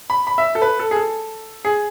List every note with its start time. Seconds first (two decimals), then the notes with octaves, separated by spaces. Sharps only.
0.10 B5
0.27 B5
0.38 E5
0.55 A4
0.62 B4
0.79 A4
0.91 G#4
0.96 A4
1.65 G#4